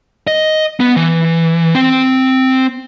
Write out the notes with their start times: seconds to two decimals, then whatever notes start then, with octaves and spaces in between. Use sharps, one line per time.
0.27 D#5
0.80 B3
0.96 E3
1.75 C4 G5